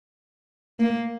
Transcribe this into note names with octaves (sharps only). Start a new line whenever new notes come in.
A#3